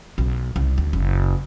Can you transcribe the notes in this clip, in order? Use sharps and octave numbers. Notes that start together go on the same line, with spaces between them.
B1
C2
D2
F#1